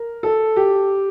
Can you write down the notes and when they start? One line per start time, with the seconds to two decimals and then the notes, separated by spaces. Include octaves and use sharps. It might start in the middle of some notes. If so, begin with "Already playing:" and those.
Already playing: A#4
0.23 A4
0.56 G4